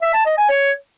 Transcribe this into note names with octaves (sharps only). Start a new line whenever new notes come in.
E5
A5
D#5
G#5
C#5